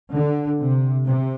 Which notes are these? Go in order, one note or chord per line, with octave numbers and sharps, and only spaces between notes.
D3
C3
C3